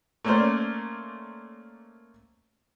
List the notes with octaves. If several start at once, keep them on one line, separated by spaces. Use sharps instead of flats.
A3 A#3 C#4 A#4 C5 D5